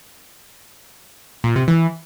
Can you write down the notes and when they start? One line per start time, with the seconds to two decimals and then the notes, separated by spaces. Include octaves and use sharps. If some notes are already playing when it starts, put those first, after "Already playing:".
1.44 A#2
1.56 C3
1.68 E3